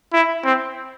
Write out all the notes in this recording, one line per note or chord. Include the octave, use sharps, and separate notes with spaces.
E4
C4